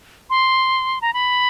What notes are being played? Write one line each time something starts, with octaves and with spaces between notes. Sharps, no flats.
C6
A#5
B5